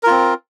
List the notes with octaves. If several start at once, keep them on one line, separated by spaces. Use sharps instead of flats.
C4 F4 A#4